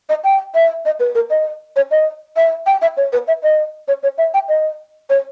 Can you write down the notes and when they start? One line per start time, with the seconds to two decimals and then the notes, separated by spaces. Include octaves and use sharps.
0.09 D#5
0.24 G5
0.55 E5
0.85 D#5
1.00 B4
1.15 A#4
1.30 D#5
1.76 C#5
1.91 D#5
2.36 E5
2.66 G5
2.82 E5
2.97 C#5
3.13 B4
3.28 E5
3.43 D#5
3.88 C#5
4.03 C#5
4.18 E5
4.34 G5
4.49 D#5
5.10 C#5